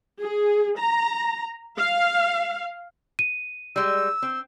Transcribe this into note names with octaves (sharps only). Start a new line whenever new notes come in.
G#4
A#5
F5
D#7
G3 G#3 E6
C4